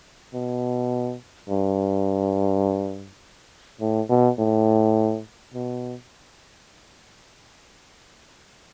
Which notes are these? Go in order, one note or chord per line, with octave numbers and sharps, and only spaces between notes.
B2
G2
A2
B2
A2
B2